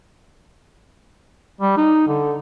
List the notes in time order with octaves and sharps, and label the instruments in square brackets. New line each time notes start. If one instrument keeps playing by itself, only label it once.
[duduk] G3
D#4
D3